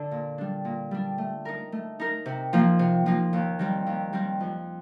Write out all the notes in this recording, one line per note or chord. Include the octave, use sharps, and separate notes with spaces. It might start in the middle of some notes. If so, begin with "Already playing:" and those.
Already playing: D3 D4
A#2
G3 D4
A#2
G3 D4
A3
D#4 A#4
A3
D#4 A#4
C3
F3 A#3 D#4
C3
F3 A#3 D#4
D#2
D#3 G3 C4
D#2
D#3 G3 C4
F2